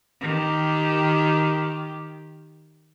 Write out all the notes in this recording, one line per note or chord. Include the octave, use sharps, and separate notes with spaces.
D#3 G4